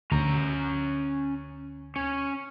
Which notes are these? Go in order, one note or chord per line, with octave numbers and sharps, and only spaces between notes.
D2 C#4 A#5
C#4